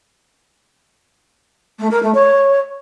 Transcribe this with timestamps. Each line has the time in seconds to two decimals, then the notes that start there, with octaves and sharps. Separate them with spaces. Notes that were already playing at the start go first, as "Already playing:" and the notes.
1.79 A3
1.90 A#4
2.02 A3
2.14 C#5